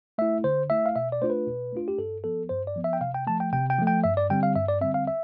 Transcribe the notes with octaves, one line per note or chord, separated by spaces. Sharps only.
A3 E4 E5
D3 C5
A3 E4 E5
F5
B2 E5
D5
A3 D4 F4 C5
B4
B2
A3 D4 F4
G4
G2 A4
F3 B3 A4
G2 C5
D5
F3 B3
E5
G5
C3 F5
G5
F3 A3 A5
G5
C3 G5
G5
F3 A3
G5
G2 E5
D5
D3 G3 C4 G5
F5
G2 E5
D5
D3 G3 C4 E5
F5
E5